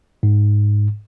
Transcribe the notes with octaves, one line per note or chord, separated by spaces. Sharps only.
G#2